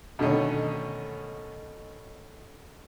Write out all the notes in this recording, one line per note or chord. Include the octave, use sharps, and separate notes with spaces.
B2 D3 D#3 A3 C#4